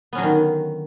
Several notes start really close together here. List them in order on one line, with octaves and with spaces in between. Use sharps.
B3 C#4 F#3 D3 D#3